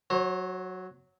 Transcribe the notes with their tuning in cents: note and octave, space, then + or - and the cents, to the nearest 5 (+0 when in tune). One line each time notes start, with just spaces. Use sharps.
F#3 +0 C5 +45